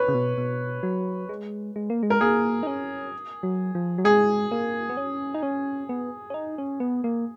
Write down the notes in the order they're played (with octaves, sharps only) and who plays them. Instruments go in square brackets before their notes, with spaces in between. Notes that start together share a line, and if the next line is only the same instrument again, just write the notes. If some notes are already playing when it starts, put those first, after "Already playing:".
Already playing: [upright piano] B4 C#5
[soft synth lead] C#3
B2
B2
F#3
G#3
G#3
A#3
G#3
[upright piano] A#4
[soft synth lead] A#3 [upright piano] G#4
[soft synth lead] D#4
C#4
F#3
F3
F#3
[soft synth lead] G#3 [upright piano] G#4
[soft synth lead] A#3
B3
C#4
D#4
C#4
B3
C#4
D#4
C#4
B3
A#3